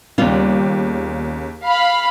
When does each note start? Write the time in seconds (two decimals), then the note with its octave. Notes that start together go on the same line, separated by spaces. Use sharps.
0.18 D#2 C#3 G3 B3 F4
1.63 F5 B5